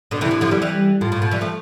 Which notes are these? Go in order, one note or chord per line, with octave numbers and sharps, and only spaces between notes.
B2 D3
C3 E3 E4
D3 F3
D3 F3
G3 B3
E3 G3
A2 F4
A2
B2
E3 G3
F3 A3